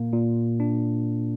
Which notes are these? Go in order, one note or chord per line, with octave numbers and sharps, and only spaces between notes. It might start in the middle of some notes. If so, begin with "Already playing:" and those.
Already playing: A#2 A#3
A#2
D4